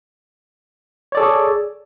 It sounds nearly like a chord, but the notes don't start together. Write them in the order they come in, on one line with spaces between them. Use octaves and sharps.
C#5 D5 A4 G#4